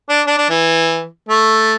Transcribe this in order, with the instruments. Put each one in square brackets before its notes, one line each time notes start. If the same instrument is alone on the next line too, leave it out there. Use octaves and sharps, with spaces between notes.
[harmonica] D4
D4
D4
E3
A3